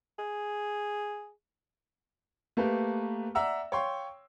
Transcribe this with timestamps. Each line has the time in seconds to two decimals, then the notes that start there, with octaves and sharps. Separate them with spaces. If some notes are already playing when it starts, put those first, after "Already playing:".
0.19 G#4
2.57 A3 A#3 G4 A#4 B4
3.35 D5 E5 F#5 A#5 E6
3.72 C#5 F5 G5 C6 C#6